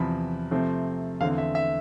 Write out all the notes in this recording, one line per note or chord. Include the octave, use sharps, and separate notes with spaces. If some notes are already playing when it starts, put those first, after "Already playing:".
Already playing: E2 C3 F3 C4 B5
C3 F3 A3 C4
E2 D3 A3 C4 F5
E5
E5